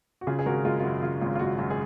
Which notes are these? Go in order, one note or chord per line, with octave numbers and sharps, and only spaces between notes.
F#4
C#3 F4 G#4
G#4
G#1 F#4 A#4
G#3 F4
F4
F#2 F#4
C#3 F4
G#1 F4
F4
G#3 F#4
F#2 F#4
G#4